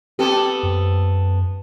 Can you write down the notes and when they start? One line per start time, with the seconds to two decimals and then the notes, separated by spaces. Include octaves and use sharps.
0.19 B3 C4 G4 A4
0.63 F#2